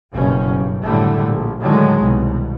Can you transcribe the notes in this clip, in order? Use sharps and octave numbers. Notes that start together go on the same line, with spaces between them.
F#1 G2 B2 C#4
G2
F#1 A2 D3 G3 A3
A#1
A2 D3 D#3 F#3 G#3
C2 B2